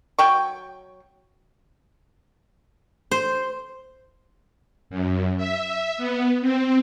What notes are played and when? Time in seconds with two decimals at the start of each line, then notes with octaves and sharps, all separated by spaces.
0.19 F#3 G5 C#6
3.11 C5
4.90 F#2
5.37 E5
5.98 B3
6.41 C4